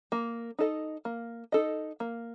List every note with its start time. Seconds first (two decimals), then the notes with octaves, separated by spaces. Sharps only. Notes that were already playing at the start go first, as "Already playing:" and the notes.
0.12 A#3
0.59 D#4 A4 D#5
1.05 A#3
1.52 D#4 A4 D#5
2.00 A#3